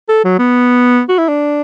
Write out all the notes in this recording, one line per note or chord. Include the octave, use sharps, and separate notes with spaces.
A4
F#3
B3
F#4
E4
D4